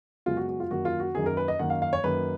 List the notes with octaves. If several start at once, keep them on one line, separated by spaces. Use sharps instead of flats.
F#2 C#3 G#3 B3 F4
F#4
F#4
F4
F#2 D#3 A#3 F#4
F4
F#4
F#2 D#3 A#3 G#4
A#4
B4
D#5
F#2 D#3 A#3 F#5
F5
F5
C#5
F#2 D#3 A#3 B4